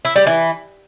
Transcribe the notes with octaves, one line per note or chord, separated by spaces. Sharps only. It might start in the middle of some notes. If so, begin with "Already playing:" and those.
E4
G3
E3